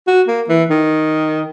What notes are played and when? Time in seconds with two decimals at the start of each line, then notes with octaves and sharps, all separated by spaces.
0.07 F#4
0.28 A#3
0.49 E3
0.70 D#3